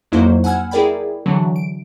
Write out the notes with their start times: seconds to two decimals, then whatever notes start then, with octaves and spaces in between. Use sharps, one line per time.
0.12 F2 F#3 A#3 D#4 E4 C5
0.44 F#5 G#5 B5 E6 F6 G#6
0.71 E4 G#4 A#4 D5 G5 B5
1.26 D3 E3 F#3
1.56 D7